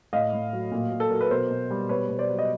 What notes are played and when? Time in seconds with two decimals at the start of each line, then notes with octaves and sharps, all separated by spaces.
0.13 A2 D#5 F5
0.33 A2
0.53 F#3
0.72 A#2
0.92 A#2
1.00 A4
1.10 F#3 A#4
1.21 B4
1.31 B2 A#4 C5
1.51 B2
1.70 G3
1.89 B2 B4 C#5
2.09 B2
2.19 C5 D5
2.29 F#3
2.39 D#5